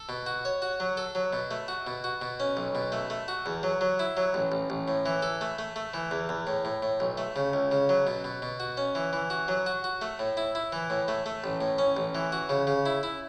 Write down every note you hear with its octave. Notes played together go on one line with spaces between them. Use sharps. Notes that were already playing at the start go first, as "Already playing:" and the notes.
Already playing: A4
B2
F#4
C#5
F#4
F#3
A4
F#3
B2
A3
F#4
B2
F#4
B2
C#4
B1
B2
A3
A3
F#4
E2
F#3
F#3
E4
F#3
A1
A1
A1
A2
E3
A4
A3
A3
A3
E3
E2
E2
A2
A2
A2
B1
A3
C#3
C#2
C#3
F#3
B2
B2
B2
F#4
C#4
E3
E3
F#4
F#3
F#4
F#4
A3
A2
E4
E4
E3
A2
A3
A3
A1
A2
C#4
A1
E3
F#4
C#3
C#3
E4
E4